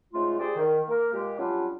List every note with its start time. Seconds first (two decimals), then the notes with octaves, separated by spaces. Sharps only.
0.13 G#2 C#3 A3 F4
0.39 G4 G#4 C5 D5
0.56 D#3
0.87 A#3 A#4
1.12 A#2 G#3 G4
1.38 F#3 G3 C#4 D4 F4 G4